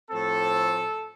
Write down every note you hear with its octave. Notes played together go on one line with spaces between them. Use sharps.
A2 F3 C4 A4